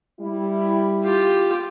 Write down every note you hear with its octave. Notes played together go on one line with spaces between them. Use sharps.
G3 E4
F4 G4